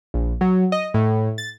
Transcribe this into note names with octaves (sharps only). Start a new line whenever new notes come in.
A#1
F#3
D#5
A2
A6